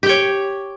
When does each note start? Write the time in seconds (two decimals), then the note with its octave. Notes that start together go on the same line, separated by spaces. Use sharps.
0.03 G4
0.06 G5
0.09 C#5